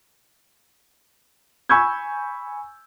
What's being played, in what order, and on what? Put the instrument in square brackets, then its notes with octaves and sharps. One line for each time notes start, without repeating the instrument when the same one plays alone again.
[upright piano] G#5 B5 C#6 E6 G6 G#6